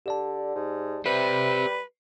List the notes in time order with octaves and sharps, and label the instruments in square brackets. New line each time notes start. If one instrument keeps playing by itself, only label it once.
[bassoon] D3 [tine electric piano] G4 D5 A5
[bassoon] G#2
[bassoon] G3 [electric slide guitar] G4 C5 [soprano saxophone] B4 [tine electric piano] E5